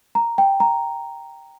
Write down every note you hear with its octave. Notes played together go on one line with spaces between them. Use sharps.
A#5
G5
A#5